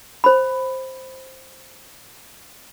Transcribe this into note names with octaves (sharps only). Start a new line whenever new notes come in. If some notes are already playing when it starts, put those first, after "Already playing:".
C5 B5